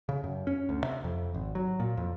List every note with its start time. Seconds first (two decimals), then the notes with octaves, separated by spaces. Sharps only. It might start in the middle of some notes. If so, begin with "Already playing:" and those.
0.09 C#3
0.24 F#2
0.47 C#4
0.69 D2
0.84 C3
1.04 F2
1.34 G#1
1.55 F#3
1.80 A#2
1.97 F2